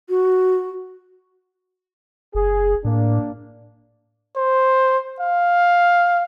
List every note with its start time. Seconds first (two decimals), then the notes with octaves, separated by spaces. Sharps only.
0.09 F#4
2.35 F#1 G#4
2.84 A2 A#3 D4
4.36 C5
5.20 F5